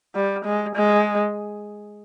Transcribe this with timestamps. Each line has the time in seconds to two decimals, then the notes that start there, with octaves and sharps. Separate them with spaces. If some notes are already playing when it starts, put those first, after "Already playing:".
0.15 G3
0.45 G#3
0.76 G#3